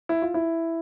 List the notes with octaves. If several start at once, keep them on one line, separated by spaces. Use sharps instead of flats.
E4
F4
E4